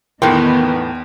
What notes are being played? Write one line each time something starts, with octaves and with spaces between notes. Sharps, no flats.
E2 A2 D#3 E3 B3 A#4 G5 C6